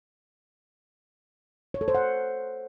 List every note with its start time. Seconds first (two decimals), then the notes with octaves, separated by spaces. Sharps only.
1.74 C#5
1.81 A4
1.88 C5
1.95 F#5